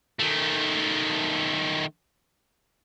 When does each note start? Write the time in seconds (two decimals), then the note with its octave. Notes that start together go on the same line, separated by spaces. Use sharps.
0.19 D#3 A3